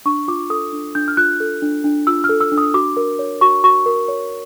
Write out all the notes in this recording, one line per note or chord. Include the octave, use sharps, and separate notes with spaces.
D4 C#6
F4 D6
A4 D#6
D4
D4 G6
F6
F4 F#6
A4
D4
D4
F4 E6
F6
A4
E6
D4
D#6
F#4 D6
A#4
C#5
F#4 C#6
F#4 C#6
A#4
C#5